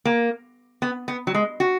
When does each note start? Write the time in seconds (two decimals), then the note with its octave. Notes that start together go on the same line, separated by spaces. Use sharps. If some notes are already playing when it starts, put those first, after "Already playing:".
0.05 A#3
0.82 B3
1.08 B3
1.27 F#3
1.34 G#3
1.60 F#4